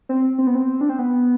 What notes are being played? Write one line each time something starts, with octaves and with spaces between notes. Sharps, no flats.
C4
C4
B3
C4
D4
C4
B3